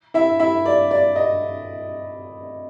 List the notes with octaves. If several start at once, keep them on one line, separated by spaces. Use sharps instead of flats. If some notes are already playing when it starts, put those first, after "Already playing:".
E4 E5
E4 E5
D5
D5
D#5